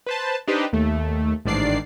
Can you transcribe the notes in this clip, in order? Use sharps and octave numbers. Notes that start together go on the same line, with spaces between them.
B4 C5 A5
D4 D#4 G4 B4 C5
D#2 A3
A1 G#2 D#3 D4 D5 C7